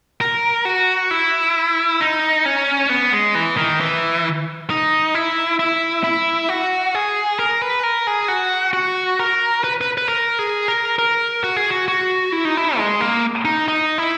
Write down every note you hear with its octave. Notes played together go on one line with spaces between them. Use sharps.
A#4
F#4
E4
D#4
C#4
B3
G#3
E3
D#3
E3
D#4
E4
E4
E4
F#4
G#4
A#4
B4
A#4
G#4
F#4
F#4
A#4
B4
B4
B4
A#4
G#4
A#4
A#4
F#4
G#4
F#4
F#4
E4
D#4
E4
G#3
A#3
D#4
D#4
E4